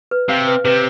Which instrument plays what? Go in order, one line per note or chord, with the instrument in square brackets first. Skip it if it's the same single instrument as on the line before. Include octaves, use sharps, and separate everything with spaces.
[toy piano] B4
[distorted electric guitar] C3 [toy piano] F5
[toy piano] B4
[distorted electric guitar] C3 [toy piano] B4